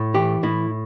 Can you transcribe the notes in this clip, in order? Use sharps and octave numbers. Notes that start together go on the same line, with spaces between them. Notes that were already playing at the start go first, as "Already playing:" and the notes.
Already playing: A2
E3 G4
A2 E4